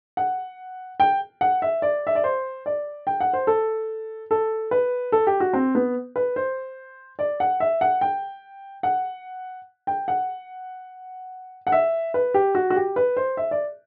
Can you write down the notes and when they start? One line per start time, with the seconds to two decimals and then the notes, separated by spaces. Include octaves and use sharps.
0.17 F#5
1.00 G5
1.41 F#5
1.62 E5
1.82 D5
2.07 E5
2.15 D5
2.24 C5
2.66 D5
3.07 G5
3.20 F#5
3.33 C5
3.47 A4
4.31 A4
4.71 B4
5.12 A4
5.27 G4
5.40 F#4
5.53 C4
5.75 B3
6.16 B4
6.36 C5
7.19 D5
7.40 F#5
7.60 E5
7.81 F#5
8.01 G5
8.83 F#5
9.87 G5
10.08 F#5
11.67 F#5
11.72 E5
12.14 B4
12.34 G4
12.55 F#4
12.70 F#4
12.76 G4
12.96 B4
13.17 C5
13.37 E5
13.51 D5